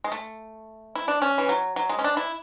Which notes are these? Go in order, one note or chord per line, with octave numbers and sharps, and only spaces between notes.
G#3
A3
E4
D4
C#4
E3
F#3
F#3
G#3
C#4
D4
E4